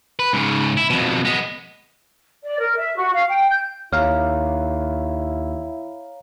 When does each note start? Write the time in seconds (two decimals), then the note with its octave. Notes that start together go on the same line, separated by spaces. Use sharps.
0.19 B4
0.33 G#2 C#3
0.77 E4
0.90 F2 B2
1.25 G#3 B3
2.43 D5
2.58 A#4
2.77 E5
2.96 F#4
3.13 F5
3.28 G5
3.50 G6
3.93 D#2 E4 C#5 F5 A#5 F6